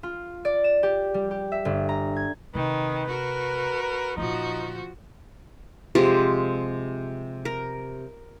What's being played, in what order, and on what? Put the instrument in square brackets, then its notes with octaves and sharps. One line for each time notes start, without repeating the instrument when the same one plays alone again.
[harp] F4
D5
E7
G4
G3
G4
E5
G1
A#5
G#6
[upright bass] C3 [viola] D#3 [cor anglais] B4
[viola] F#4 A#4
[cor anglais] B4
[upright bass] A#2 D3 [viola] F3 F#4 [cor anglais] D#4
[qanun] C3 F3 G#3 G4
A#4